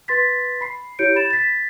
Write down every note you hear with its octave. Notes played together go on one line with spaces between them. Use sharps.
B4 C6 A6 B6
B5 C7
E4 G4 C#5 G6 C#7 D7
B5 A6 E7
A6 B6